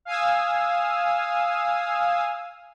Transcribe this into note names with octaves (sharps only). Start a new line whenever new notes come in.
F5 G#5 D#6 E6